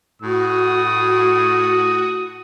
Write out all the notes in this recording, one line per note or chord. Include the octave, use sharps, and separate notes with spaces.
A2 F#4 D#6